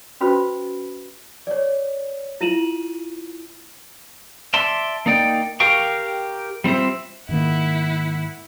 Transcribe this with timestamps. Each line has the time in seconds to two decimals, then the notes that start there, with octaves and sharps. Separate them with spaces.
0.21 C#4 F4 F#4 B4 C5 B5
1.47 C#5 D5
2.41 E4 F4 D#7 E7 F#7
4.54 D5 E5 A5 C6
5.06 A#3 D#4 D5 G5
5.60 G4 A#4 F5 G5 C#6
6.64 G3 C4 F4 C5 E5
7.29 G#2 D#3 A#3 E4 F#5